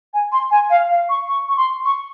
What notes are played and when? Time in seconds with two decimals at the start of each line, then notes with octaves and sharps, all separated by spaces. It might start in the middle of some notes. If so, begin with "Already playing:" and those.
0.14 G#5
0.32 C6
0.51 G#5
0.70 F5
0.89 F5
1.09 C#6
1.27 C#6
1.49 C#6
1.57 C6
1.85 C#6